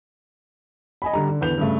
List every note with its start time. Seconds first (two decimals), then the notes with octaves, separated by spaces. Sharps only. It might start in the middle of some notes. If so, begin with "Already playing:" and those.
1.02 D#5 G#5 B5
1.14 D3 G3 A#5
1.30 D3
1.41 E2 D3 B4 G6 F7
1.58 G2 C#3 A3